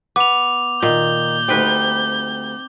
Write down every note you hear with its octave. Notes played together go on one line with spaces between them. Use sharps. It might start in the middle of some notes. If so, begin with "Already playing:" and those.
B3 D6 F7
A#2 D#3 G6
D2 G3 C4 D#4 B4